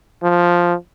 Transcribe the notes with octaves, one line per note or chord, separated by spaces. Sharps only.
F3